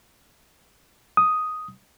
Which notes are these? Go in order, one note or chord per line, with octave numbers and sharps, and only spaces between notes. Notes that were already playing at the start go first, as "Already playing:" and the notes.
D#6